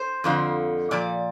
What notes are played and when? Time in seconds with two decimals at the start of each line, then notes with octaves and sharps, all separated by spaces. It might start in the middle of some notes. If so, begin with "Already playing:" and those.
Already playing: C5
0.24 F2 D3 F3
0.91 A#2 F3 D5